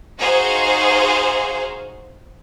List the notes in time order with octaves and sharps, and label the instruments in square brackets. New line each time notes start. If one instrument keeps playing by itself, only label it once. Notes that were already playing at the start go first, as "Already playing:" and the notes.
[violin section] D#4 F#4 G#4 C5 F5